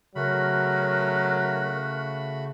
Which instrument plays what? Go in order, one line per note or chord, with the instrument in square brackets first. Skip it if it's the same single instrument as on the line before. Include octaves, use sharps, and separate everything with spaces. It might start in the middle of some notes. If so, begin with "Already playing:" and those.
[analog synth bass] C#3 [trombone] F#3 [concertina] A3 F#4 B5 [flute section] A#4 F6 F#6